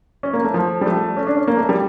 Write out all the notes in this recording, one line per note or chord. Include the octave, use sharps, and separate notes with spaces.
C#4
A#3
A3
F3
G3
A3
C#4
D4
C#4
A#3
A3
G3